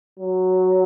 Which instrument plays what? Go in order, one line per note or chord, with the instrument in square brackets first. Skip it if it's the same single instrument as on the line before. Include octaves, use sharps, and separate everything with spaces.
[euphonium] F#3